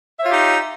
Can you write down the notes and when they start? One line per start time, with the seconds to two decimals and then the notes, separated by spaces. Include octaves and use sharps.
0.19 E5
0.23 C#5
0.26 F4
0.30 G4
0.33 D#4